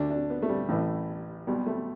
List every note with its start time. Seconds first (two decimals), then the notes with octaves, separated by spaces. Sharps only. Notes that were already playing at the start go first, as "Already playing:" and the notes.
Already playing: D2 D3 D4
0.11 D4
0.30 B3
0.42 A3
0.49 G3
0.69 A1 A2 E3
1.47 B1 B2 G3
1.67 A3